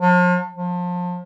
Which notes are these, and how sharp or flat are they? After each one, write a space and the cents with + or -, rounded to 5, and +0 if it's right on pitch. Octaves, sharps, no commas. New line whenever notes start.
F3 +40
F3 +30